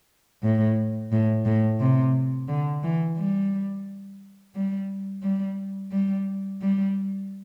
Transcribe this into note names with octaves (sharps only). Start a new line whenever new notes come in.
A2
A2
A2
C3
D3
E3
G3
G3
G3
G3
G3